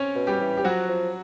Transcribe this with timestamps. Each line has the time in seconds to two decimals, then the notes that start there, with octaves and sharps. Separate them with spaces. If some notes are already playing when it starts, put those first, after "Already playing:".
Already playing: C4 C#4 C#5
0.15 B2
0.27 G3 G4
0.40 E3
0.57 G4
0.64 F3 F#3 F#4
0.89 F3